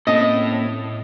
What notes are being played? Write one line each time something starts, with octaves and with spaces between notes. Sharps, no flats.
A2 A#3 C4 C#4 A4 D#5